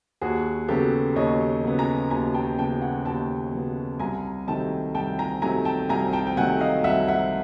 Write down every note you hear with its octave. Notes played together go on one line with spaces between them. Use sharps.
D#2 F#4 G#4
C#3 F#3 B3 G4 A4
D#2 C#5 D#5
C#3 F#3 B3
G#5 A#5
D#2 G#5 A#5
G5 A5
C#3 F#3 B3 G5 A5
F#5 G#5
D#2 G5 A5
C#3 F#3 B3
C2 G#5 A#5
C3 D#3 F#3 A3 G5 A5
C2 G5 A5
G#5 A#5
C3 D#3 F#3 A3 G#5 A#5
G5 A5
C2 G#5 A#5
G5 A5
G5
C3 D#3 F#3 A3 F#5 G#5
D#5 F5
C2 E5 F#5
E5 F#5